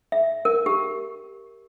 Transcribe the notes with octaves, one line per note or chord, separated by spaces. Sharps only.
E5
A#4
G4